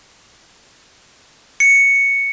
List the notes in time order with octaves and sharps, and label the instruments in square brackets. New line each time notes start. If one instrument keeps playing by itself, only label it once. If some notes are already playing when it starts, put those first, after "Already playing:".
[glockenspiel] C#7